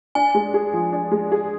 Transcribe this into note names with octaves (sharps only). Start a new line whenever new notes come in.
D4 G#5
G#3
G#4
F3
D4
G#3
G#4